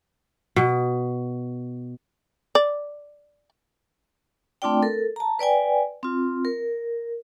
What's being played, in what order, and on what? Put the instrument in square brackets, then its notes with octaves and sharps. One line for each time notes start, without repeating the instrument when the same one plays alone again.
[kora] B2
[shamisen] D5
[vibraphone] A3 C4 D4 F4 D5 G5
A4 A#4
A5 A#5
B4 D5 G5 G#5
C4 F4
A#4